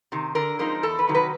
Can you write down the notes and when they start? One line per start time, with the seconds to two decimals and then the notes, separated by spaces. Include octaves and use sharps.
0.12 C3 D#3
0.35 D3 A#4
0.59 F3 G#3 C4 D#4 A#4
0.83 E2 A4
0.99 B4
1.07 C3 D#3 F#3
1.15 B4